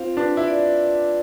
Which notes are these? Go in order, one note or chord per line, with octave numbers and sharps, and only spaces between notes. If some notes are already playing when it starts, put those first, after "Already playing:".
Already playing: C4 F4 F5
D4 B4
E4
D5